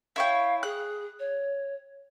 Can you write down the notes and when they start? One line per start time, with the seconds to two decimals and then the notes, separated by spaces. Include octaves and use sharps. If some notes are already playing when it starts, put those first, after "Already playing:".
0.16 E4 C#5 F5 G5
0.63 G#4 F#6
1.19 C#5